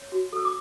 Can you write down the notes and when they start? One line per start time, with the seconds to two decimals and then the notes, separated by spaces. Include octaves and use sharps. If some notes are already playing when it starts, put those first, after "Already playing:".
Already playing: C#5
0.12 F#4
0.33 A4 E6
0.45 D6